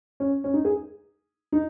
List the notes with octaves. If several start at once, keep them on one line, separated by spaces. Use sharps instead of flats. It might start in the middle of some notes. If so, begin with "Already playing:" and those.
C#4
C#4
D#4
G#4
D#4